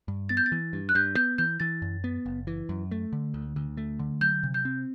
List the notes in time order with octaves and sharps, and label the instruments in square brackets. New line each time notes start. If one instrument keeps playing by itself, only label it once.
[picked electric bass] G2
[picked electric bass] B3 [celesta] A6
[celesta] G6
A6
[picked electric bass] E3
G2
[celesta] F#6
[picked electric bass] G2 [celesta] G6
[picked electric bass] B3 [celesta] G6
[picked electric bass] E3 [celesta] G6
[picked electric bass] E3 [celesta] A6
[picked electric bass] F#2
B3
F#1
E3
F#2
A3
D3
D2
D2
A3
D3
[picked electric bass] F#3 [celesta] G6
[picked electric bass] C3
[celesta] G6
[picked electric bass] C4